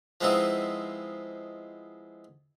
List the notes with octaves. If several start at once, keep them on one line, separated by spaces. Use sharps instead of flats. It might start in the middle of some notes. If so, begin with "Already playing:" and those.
F3 G#3 B3 C4 D#4 E4